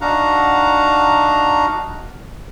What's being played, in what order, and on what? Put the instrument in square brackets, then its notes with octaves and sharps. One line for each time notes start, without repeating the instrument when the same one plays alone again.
[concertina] D4 D#4 F#4 F5 F#5 A#5